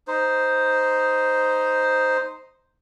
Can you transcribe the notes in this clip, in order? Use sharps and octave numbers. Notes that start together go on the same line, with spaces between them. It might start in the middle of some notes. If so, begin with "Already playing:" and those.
D#4 C5